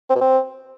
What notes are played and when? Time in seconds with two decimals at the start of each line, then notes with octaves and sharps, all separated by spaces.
0.10 C4
0.16 B2
0.21 C4